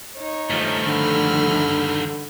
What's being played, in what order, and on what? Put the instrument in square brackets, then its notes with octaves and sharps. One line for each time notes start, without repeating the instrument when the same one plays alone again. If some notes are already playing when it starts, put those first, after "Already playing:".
[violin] D#4 C#5
[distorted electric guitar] G2 D#3 [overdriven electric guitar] F3 A3
[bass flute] D3 [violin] B5 F6